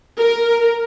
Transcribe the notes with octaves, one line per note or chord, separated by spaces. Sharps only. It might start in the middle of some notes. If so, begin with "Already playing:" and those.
A#4